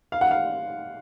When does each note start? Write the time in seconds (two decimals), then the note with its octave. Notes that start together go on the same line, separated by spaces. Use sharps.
0.12 F5
0.21 F#5
0.31 F5